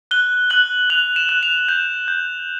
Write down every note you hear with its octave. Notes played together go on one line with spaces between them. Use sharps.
F#6 G7
F#6 F#7
F#6 F7
E7
F#6
F7
G6 E7
G6